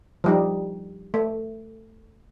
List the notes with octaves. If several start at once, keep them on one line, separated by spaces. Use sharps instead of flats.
F3 G3 D#4
A3